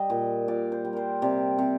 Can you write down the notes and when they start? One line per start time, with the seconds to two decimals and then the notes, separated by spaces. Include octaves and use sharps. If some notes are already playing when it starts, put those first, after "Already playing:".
Already playing: G3 D#5
0.10 A#2
0.48 A#2 D5
0.72 C5
0.85 G3
0.93 A#4 C5
1.22 C3 D5
1.58 C3